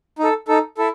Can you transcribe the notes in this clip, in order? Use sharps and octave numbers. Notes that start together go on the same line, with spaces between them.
D#4 A4
D#4 A4
E4 A4